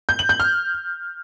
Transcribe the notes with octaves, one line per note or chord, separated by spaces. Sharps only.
G6
F#7
G6
F6